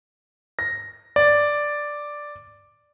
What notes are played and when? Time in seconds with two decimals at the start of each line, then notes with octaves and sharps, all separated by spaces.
0.59 A#6
1.16 D5